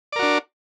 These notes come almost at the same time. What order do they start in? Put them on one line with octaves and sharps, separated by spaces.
D5 A#4 F#4 D4